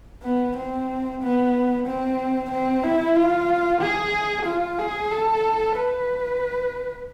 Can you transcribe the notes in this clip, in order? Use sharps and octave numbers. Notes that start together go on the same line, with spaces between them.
B3
C4
B3
C4
C4
E4
F4
G#4
F4
G#4
A4
B4